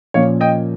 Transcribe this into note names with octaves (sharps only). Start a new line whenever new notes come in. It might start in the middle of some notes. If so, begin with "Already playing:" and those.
A#2 F3 A#3 C#4 C#5 F5
D#5 G5